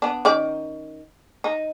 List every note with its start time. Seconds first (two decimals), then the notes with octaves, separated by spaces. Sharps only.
0.02 B3 D4
0.25 D#3 C#4 D5
1.44 D#4